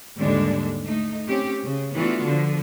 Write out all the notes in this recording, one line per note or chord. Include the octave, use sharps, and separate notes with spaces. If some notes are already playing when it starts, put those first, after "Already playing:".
D#2 G#2 D3 G3 G#3 D4
A3 D#4
C4 C#4 G4
C#3
E3 A3 B3 D4 F4 F#4
D3 F3